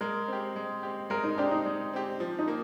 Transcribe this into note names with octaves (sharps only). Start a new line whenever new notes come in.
G#3 A#4
C4 G4
G#3
C4 G4
G#3 A#4
D#4
C4 D4 G4
D#4
G#3
C4 G4
F3
D#4
A#3